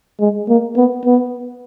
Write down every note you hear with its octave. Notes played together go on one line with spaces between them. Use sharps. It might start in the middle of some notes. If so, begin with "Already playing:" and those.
G#3
A#3
B3
B3